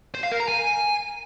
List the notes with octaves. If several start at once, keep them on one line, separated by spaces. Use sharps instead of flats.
C5
F5
A#4
A#5
G#5